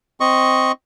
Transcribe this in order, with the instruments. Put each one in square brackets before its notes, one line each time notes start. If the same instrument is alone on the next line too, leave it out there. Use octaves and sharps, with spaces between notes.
[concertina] C4 D#5 C#6